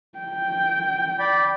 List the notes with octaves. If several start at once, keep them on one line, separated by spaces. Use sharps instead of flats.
G5
D5 B5